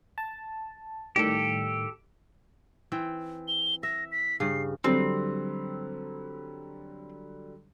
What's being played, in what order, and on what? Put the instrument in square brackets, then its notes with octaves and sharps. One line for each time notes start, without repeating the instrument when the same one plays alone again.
[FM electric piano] A5
[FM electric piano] A2 D#3 G3 [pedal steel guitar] G4 A4
[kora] E3 C4 G5
[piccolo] G7
[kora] E5 [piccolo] A#6
[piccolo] B6
[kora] G2 C#3 [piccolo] C7
[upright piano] D3 F#3 G3 [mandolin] C4